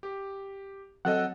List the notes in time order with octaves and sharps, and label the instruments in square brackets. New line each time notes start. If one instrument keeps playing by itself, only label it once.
[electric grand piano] G4
[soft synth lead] F#3 [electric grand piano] C4 A4 D#5 [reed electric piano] F#5